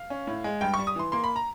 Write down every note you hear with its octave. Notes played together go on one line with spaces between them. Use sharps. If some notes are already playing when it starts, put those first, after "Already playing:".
Already playing: F5
C#4
A2
G#3
G2 G5
C#6
G3
D#6
E3 C6
A#3 C6
B5
A#5